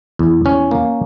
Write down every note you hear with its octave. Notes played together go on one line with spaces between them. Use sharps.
E2
E2 C#4
A#3